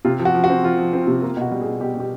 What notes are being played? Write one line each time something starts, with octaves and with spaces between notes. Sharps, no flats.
C3 F4
F3
F#4
F3
F#4
C4
F3 F4
F3
C4
C3
A#3 F4
B2 F#4
G3
G#4
B2
B2 G4
B2 G4